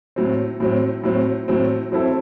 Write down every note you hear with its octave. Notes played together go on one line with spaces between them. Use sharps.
A2 F#3 C4
A2 F#3 C4
A2 F#3 C4
A2 F#3 C4
F#3 C4 E4 A4